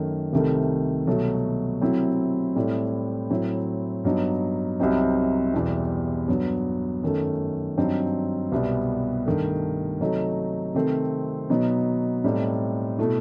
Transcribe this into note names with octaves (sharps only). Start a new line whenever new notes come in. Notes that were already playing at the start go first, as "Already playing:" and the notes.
Already playing: F#2 D#3 A3
C2 C3 D#3 A3
C2 B2 F#3 A3
C3 F#3 A3 C4 E4
A2 G3 C4 E4
A2 F#3 C4 E4
G2 F#3 B3 D#4
C2 C3 F#3 C4 D#4
E2 B2 G3 C4 E4
G2 F#3 B3
F#2 D#3 A3
G2 F#3 C4 D#4
C2 B2 G3 B3
G2 D#3 A3
C3 F#3 A3 D#4
C3 D#3 A3 C4
B2 F#3 B3 D#4
A2 G3 C4 D#4
B2 A3 E4